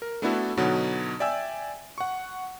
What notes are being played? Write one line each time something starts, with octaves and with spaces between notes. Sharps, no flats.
A#4
A3 B3 D4 E4 F#4 A4
B2 D3 F#3 B3 D#4 F#4
D5 E5 G5 G#5 E6
F#5 C#6